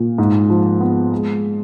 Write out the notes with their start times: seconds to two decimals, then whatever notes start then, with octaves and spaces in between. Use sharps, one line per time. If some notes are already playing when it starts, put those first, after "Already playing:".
Already playing: A#2
0.18 G#2
0.50 F3
0.81 B3
1.12 G#3